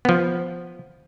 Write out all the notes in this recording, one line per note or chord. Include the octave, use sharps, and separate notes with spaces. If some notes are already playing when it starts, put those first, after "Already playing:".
F3 B3